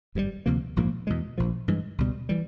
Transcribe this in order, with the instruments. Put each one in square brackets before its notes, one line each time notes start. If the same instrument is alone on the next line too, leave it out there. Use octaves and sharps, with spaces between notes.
[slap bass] G#1 G2 D#3 G3
D2 C3 F3 A#3
A#1 G#2 F3 A#3
E2 B2 G#3
A#1 A#2 F3
G2 E3 G#3
C#2 B2 G3
E3 G3